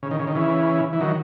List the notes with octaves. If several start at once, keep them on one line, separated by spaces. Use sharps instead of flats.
C#3
D#3
C#3
D#3
C#3 E3
E3
D#3 F#3